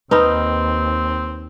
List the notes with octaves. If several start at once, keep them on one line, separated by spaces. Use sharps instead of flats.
D#2 C4 D#4 B4 B5